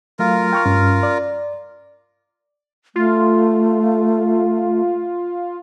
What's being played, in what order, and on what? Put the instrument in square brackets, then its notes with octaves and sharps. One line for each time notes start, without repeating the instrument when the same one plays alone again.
[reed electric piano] F#3 A3 F5 [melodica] F4 A#4
[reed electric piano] G5 C#6 F6
G2 C#4
D5
[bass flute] A3 [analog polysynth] F4